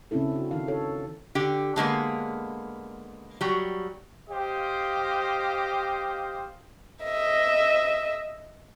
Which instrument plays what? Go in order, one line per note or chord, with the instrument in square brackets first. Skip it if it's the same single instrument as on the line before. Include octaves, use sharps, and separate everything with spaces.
[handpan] C#3 C4 C#4 E4 A4
D4 F#4
D#3 D#4 F5
E4 A4 C#5
[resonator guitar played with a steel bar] D3 G4
D3 G#3 A#3 B3
F#3 G3
[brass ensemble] G4 C5 D#5 F5
[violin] D#5 E5